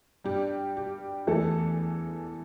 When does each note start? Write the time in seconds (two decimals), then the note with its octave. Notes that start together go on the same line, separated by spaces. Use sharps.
0.24 G2 G3 G4
0.77 G4
1.27 E2 E3 A3 A4